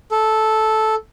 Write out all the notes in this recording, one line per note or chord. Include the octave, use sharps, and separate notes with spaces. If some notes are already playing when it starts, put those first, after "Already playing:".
A4